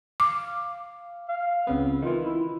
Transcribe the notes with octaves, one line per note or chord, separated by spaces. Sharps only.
F5 D6
F5
C#2 C#3 B3 C4
D#3 E3 F4
E4